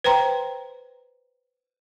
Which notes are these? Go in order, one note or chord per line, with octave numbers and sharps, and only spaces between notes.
B4 C5 G5 A#5 C6